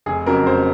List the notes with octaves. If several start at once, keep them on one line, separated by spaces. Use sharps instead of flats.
F1 G#4
F2 C#3 F#3 A#4
F1 C5